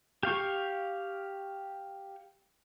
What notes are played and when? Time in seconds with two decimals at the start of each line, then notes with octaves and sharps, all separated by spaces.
0.23 G4 F5 C#6